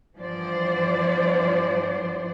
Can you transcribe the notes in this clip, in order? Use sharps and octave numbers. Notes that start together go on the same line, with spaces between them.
G2 E3 F3 B3 C5 D5